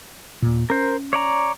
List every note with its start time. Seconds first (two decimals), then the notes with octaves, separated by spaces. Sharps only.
0.42 D#2 A#2
0.70 C#4 A#4 C5
1.13 C#5 D5 A#5